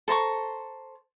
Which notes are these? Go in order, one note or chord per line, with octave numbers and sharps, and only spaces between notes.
A4 C5 A#5 C#6